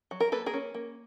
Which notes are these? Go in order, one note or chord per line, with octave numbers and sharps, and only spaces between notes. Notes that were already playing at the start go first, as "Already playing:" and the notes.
F#3
A#4
A#3 A4 B4
G#4 A#4
C#4
A#3